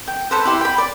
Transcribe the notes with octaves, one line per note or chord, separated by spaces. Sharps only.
G5
A4 B4 C5
E4 G4 C6
G5 B5
D5